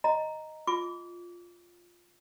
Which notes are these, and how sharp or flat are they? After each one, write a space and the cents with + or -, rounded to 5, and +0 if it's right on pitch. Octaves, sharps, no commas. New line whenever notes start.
D#5 +0 A#5 +0
F4 +0 D6 -30